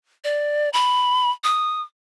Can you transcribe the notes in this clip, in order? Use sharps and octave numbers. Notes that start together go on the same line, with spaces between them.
D5
B5
D#6